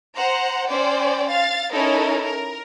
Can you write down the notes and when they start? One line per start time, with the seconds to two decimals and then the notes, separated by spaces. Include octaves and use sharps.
0.17 C5 F#5 A#5
0.69 C#4 C5 D5 G5
1.30 F5 A6
1.72 C#4 D#4 E4 A4 A#4
2.25 A#4